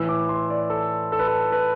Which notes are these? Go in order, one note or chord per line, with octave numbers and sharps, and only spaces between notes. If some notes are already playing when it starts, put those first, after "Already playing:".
Already playing: A2 E3 E6
D6
C6
D5
A4
A4
B4
A4
B4